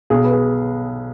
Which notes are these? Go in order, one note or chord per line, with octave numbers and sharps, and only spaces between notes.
B1 G#4
B4
G#4